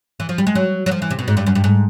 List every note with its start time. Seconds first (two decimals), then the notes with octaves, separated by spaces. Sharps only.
0.20 E3
0.29 F3
0.38 G3
0.47 G#3
0.55 F#3
0.86 F#3
0.91 F3
1.02 E3
1.11 C3
1.19 B2
1.28 G#2
1.37 G2
1.46 F#2
1.55 G2
1.64 G#2